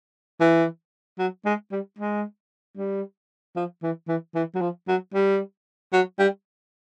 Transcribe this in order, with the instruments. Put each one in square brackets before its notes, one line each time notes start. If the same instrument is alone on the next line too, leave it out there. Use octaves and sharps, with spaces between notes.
[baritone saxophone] E3
F#3
G#3
G3
G#3
G3
F3
E3
E3
E3
F#3
F3
F#3
G3
F#3
G3